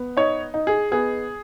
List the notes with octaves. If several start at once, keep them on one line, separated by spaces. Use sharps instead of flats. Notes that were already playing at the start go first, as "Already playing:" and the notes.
Already playing: B3
D#4 C#5
D#4
G#4
B3 G#4